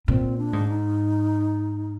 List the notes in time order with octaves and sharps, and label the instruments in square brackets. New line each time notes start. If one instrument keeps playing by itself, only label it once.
[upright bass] A#2 [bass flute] C4
[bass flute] D4
[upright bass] G#2
[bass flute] D#4